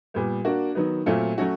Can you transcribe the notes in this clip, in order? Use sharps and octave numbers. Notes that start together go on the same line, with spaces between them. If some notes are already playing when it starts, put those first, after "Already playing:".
A#2 G3 B3
A#3 D4 F#4
D#3 F#3 B3
A#2 F#3 A3 C4 F4
F#3 A3 C#4 F#4